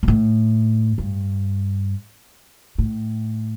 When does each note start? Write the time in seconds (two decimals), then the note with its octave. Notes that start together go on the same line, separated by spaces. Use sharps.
0.03 A#2
0.08 A2
0.98 G2
2.78 A2